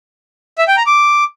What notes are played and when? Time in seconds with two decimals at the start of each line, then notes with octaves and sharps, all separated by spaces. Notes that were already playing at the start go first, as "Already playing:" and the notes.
0.58 E5
0.68 G5
0.77 A#5
0.86 D6